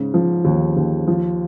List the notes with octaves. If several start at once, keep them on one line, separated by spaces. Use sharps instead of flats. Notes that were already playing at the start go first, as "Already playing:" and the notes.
Already playing: G#2 C#3
F3
D#2
D#2
F3